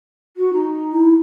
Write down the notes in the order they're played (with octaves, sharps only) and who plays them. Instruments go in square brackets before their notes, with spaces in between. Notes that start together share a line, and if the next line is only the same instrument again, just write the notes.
[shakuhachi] F#4
D#4
[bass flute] E4